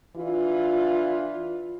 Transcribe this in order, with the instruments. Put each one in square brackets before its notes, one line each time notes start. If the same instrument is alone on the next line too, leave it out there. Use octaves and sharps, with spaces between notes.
[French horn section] E3 D4 F4